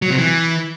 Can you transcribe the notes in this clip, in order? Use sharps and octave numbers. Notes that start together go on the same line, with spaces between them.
F#3
C3
E3